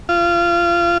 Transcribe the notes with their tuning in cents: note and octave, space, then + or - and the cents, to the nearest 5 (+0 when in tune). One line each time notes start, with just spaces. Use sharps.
F4 -25